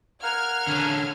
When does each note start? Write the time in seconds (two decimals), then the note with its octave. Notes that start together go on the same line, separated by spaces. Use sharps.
0.23 A#4 F5 F#5 F6 G#6
0.67 D3 C#4